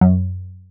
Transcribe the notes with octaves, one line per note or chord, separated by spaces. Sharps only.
F#2